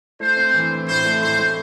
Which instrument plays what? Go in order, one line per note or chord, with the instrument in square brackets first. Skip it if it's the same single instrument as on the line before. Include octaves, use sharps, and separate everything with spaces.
[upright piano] A3 [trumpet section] C5
[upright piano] C4
E3
C4
[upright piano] A2 [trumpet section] C5
[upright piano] A3
[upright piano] A2 [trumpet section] C5
[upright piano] A3